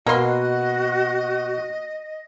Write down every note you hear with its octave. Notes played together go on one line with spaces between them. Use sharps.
B2 A#3 F#4 D#5 C6